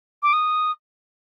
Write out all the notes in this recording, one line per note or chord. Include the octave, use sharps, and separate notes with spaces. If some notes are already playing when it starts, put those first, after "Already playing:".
D6
D#6